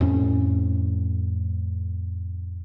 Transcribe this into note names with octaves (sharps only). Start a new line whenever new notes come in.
F2 A2 C#4